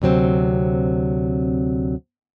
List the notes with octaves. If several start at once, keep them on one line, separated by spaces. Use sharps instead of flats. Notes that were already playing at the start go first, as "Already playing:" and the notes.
D2 C3 F#3 C4